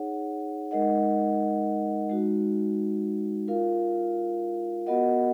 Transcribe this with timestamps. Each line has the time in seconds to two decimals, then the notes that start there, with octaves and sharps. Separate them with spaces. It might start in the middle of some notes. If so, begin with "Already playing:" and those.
Already playing: D#4 G#4 C#5 F#5
0.71 G#3 D#4 A#4 D#5 F#5
2.09 G#3 D#4 F#4
3.48 F4 A#4 F5
4.86 B3 F#4 A#4 D#5 F#5